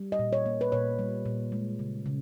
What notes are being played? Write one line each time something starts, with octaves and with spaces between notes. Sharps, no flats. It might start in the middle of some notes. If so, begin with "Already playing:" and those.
Already playing: G3
D#5
A#2
C#5
A#3
B4
A#2 C#5
G3
A#2
G#3
C#3
C#3